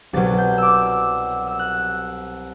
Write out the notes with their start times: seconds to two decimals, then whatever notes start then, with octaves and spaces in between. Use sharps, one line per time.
0.13 C2 B2 F#3 A6
0.38 G6
0.58 D6 E6
0.86 E6
1.47 E6
1.59 F#6